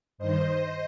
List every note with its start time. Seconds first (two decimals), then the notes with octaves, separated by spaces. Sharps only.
0.18 G2 D#3 C5 D#5